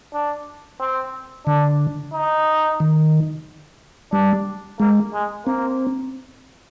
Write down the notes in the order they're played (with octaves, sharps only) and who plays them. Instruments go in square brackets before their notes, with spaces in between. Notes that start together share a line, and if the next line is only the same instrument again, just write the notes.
[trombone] D4
C4
[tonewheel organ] D3 [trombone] D4
[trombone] D#4
[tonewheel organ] D#3
[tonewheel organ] G3 [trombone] D4
[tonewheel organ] G#3 [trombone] A#3
[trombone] G#3
[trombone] A#3 [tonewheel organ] C4